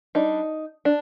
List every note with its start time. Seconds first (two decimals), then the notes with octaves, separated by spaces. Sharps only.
0.15 G3 D4 D#4
0.85 D4